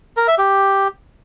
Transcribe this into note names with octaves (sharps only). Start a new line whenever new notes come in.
A#4
E5
G4